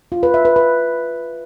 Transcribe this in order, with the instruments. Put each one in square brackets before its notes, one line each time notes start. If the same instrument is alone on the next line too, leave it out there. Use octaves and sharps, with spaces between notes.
[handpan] F4
B4
E5
B4
B4